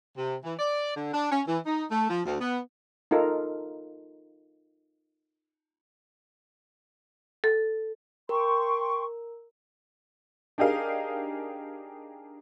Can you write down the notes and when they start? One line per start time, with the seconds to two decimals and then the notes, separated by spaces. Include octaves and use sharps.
0.17 C3
0.44 E3
0.59 D5
0.96 D3
1.13 D4
1.31 C#4
1.47 E3
1.66 D#4
1.91 A3
2.09 F3
2.25 D2
2.41 B3
3.11 D#4 F4 A4 A#4
7.44 A4
8.29 A#4 G5 C6 C#6
10.58 D4 D#4 G4 G#4 A#4 F5